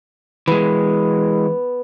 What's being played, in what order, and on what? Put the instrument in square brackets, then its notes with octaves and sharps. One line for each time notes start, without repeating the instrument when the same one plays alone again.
[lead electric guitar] E3 G#3 [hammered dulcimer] B3